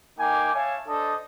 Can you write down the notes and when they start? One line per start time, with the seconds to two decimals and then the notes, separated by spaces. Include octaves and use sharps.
0.19 A#3 D#4 G5 G#5 D6
0.55 C#5 E5 F5 G#5 A5
0.88 D4 A4 C5 D#5